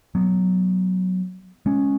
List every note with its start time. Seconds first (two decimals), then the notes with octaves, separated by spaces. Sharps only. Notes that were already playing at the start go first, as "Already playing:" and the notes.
0.15 F#3 B3
1.66 G#3 C#4